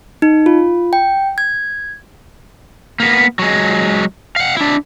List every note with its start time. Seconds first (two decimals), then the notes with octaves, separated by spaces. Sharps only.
0.22 D#4
0.46 F4
0.93 G5
1.38 G#6
3.00 A#3 B3
3.39 F#3 G#3
4.36 F5 F#5
4.57 D4 E4